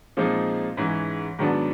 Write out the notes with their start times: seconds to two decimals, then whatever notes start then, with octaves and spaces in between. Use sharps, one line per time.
0.17 A#2 F3 G#3 C4 D#4
0.77 G#2 E3 G#3 C#4
1.39 G#2 D#3 F#3 B3 D4